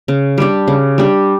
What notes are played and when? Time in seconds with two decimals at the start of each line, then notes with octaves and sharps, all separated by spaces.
0.08 C#3
0.38 G3 D4 G4
0.68 C#3
0.98 G3 D4 G4